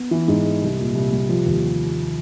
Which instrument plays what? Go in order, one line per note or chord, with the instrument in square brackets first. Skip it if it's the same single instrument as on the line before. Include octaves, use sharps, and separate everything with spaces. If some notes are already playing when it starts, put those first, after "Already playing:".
Already playing: [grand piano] B3
E3
G#2
G#3
C2
A#2
C2
G3
F3
D#2